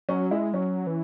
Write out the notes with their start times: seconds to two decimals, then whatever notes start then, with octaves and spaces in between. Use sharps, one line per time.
0.09 F#3 C#4
0.31 G#3 E4
0.53 F#3 C#4
0.87 E3